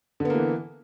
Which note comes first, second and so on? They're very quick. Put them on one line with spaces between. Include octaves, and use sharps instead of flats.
D3 B3 A#3 E3